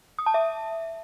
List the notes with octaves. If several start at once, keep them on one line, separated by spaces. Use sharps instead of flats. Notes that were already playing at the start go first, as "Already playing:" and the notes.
D#6
A5
E5